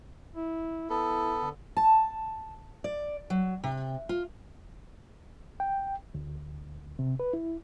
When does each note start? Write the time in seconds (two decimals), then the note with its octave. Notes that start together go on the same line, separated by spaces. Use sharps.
0.36 E4
0.90 B3 E4 A4
1.41 D3
1.77 A5
2.84 D5
3.30 F#3
3.64 C3
4.09 F4
5.60 G5
6.15 D2
6.99 C3
7.20 B4
7.33 E4